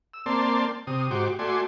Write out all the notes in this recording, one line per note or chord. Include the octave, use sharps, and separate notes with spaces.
E6
A#3 C4 D5 A5 C6
C3 D#6
G#2 F#4 G4 C5 D6
A3 F#4 D5 G#5 C6